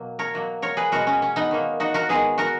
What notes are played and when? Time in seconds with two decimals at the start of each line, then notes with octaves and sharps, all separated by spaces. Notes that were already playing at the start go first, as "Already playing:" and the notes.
Already playing: B2 F#3 A#3
0.19 A#4 C#5
0.34 B2 F#3 A#3
0.62 A#4 C#5
0.77 G#4 B4
0.92 B2 G#3 B3 F#4 A#4
1.07 C#4
1.22 C#4
1.36 B3 D#4
1.51 D#3 A#3
1.80 D#4 F#4
1.94 F#4 A#4
2.09 D#3 G#3 B3 G#4 B4
2.38 F#4 A#4